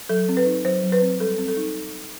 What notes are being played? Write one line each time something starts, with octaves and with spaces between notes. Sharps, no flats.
F#3 A4
C4
B4
D#4
F#3 C5
F#3
B4
C4
G3 A4
C4
A4
D#4